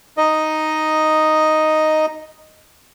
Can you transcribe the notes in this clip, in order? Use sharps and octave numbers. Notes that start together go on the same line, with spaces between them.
D#4 D#5